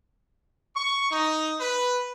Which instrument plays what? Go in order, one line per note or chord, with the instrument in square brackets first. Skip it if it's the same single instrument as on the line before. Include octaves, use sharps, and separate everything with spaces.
[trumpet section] C#6
D#4
B4